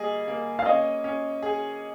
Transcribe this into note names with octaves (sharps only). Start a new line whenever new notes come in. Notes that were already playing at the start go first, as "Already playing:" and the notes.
Already playing: G3 A#3 G#4 D#5
A#3
F5
C#4 D#5
C#4
G#4